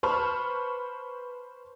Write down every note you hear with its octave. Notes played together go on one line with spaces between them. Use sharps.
B4 C5 A5 B5 C#6 F6